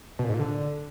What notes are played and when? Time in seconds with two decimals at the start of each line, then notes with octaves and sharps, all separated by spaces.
0.19 B2
0.24 A#2
0.29 G#2
0.34 A#2
0.39 D3